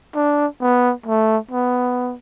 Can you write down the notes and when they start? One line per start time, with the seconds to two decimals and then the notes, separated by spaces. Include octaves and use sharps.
0.15 D4
0.61 B3
1.06 A3
1.51 B3